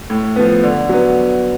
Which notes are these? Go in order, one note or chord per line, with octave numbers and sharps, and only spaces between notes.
A2
F3 B3
D3
F#3 B3